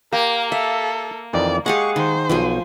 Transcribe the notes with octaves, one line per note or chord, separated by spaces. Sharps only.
A#3 G4 A#4
A4 E5
F2 D#3 E3 D5
G#3 G4 G#4 F5 F#5 C#6
D#3 C5
B1 B2 F3 G5 G#5